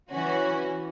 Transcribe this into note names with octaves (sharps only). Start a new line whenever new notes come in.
E3 C#4 F#4